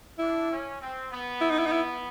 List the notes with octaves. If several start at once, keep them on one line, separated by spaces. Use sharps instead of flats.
D4 E4
C#4
C4
B3
E4
D#4
E4
D#4
E4